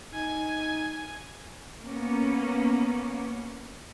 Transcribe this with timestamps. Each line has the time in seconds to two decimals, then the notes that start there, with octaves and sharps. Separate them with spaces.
0.14 D#4 G#5
1.81 A#3 B3 C#4